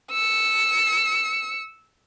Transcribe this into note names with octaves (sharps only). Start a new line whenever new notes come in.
E6 C#7